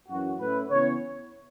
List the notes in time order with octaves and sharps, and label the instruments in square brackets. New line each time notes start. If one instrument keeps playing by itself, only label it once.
[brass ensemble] F#2 E3 C#4 F#4
A2 A3 C#4 E4 B4
C#3 E3 B3 C#5